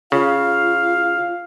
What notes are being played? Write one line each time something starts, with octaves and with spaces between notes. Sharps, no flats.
C#3 F4 F5